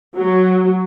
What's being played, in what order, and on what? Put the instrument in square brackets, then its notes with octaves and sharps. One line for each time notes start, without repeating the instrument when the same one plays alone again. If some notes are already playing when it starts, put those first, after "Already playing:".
[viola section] F#3